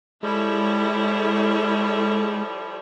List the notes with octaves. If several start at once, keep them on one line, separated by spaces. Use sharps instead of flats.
F3 G3 G#3 E4 A4 C#5